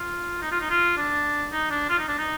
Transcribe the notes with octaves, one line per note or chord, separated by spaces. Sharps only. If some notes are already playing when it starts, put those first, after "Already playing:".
Already playing: F4
D#4
F4
D#4
F4
D4
D#4
D4
F4
D#4
D4
D#4